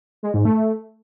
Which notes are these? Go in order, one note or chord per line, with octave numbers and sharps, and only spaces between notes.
G#3
G#2
A3